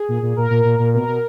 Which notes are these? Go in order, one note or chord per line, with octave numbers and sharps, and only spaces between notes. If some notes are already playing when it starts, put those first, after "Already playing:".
Already playing: G#4
A#2
A#2
A#2 A#4
A#2
A#2
A#2
B2 A#4
B2